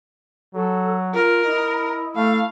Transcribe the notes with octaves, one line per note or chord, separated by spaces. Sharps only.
F#3 A4
F4 A#4
E4 D#5
A3 F5